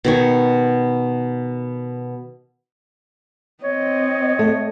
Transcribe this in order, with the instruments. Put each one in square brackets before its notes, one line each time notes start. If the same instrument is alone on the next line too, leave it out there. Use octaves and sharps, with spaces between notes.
[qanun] B2 D#3 C#5
[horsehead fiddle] C4 D#5 [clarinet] C#5
[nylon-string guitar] A3